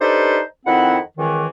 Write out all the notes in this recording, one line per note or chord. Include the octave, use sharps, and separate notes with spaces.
D4 D#4 G4 A4 B4 C5
F2 D#3 C4 E4 F#5
C#2 D#3 E3